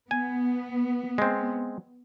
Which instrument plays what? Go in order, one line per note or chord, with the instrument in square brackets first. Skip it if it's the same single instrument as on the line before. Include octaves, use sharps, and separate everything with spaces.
[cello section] B3 [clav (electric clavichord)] G#5
[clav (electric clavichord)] G#3 C4